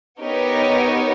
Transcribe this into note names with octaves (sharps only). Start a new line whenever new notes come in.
B3 D#4 G4 A#4 C#5